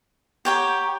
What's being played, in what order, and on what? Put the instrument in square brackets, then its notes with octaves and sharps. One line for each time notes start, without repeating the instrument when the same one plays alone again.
[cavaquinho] G4 C#5 G5 [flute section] F#5 A#5